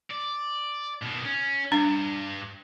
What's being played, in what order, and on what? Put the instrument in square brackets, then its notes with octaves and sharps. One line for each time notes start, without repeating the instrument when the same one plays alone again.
[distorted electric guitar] D5
B2 D#3
C#4
[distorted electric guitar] G2 [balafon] D4